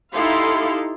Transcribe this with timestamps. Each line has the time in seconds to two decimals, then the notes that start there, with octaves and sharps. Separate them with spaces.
0.12 D#4 E4 G4 A4 F5 C6